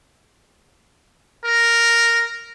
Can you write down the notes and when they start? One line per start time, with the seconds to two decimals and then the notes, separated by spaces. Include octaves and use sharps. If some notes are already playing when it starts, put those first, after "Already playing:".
1.45 A#4